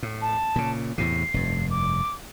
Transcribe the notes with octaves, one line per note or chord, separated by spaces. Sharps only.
A2
A5
A#2 C#3
E2 A2 C3 C7
F1 G2
D6